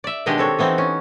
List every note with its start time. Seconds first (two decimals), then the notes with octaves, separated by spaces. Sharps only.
0.04 D5 E5
0.26 B2 D#3 G#3 D4 G4 D#5
0.38 C4 A4 C#5
0.59 E3 B3 C4 D#4
0.78 C#4